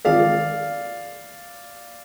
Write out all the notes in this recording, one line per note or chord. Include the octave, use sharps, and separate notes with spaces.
D#3 G#3 C4 F4 G#4 D5 F5